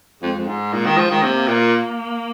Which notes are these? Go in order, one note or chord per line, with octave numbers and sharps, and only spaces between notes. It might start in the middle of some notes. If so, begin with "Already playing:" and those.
F2 G#3
F2
G#2
A#2
D#3
F3
D#3
C3 A#3
A#2